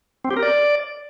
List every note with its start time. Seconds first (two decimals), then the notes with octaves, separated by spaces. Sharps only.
0.24 C4
0.31 G4
0.37 A#4
0.43 D5